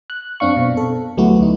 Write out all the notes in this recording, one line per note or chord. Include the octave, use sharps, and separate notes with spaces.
F#6
F#2 C4 D4 F5 C#6
B2
A4
D2 F#3 A3 B3 E4 F#4
D2 D#4